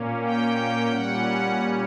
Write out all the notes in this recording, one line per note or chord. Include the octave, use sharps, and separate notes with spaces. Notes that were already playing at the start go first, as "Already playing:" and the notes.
Already playing: A#2 A#3 C#4
G5
A#2 G3 C#4 F#5